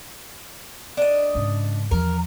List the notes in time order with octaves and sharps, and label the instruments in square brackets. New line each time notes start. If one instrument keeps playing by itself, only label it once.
[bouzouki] D4 D#5
[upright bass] G#2 C#3
[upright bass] E2 F3 [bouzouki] A#4